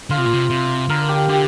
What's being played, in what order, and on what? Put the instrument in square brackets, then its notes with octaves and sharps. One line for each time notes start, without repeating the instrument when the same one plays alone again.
[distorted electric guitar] D3 [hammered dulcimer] F4
[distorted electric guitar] C3
A#2
C3
C3
[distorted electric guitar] D3 [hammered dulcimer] A#4
[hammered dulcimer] G4
[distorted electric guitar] D3 [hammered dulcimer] G4